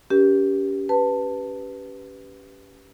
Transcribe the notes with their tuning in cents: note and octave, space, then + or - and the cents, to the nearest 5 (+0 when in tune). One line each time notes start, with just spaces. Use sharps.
C#4 +30 G4 +0 A#4 +45
B4 +0 A5 +10